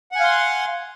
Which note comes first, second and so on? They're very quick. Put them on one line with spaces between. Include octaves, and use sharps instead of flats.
F#5 G#5 F5 C6